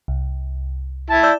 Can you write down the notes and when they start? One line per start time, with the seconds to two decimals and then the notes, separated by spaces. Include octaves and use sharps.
0.08 C2
1.10 E4 A5
1.23 D5 E6 G6